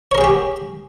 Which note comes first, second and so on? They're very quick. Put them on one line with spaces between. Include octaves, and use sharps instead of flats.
C#5 A#4 G#4 G5 G4